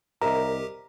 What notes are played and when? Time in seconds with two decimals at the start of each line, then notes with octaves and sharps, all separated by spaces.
0.22 C2 G4 A#4 D#5 E5 A#5